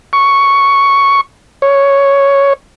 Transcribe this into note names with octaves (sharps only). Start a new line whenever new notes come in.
C#6
C#5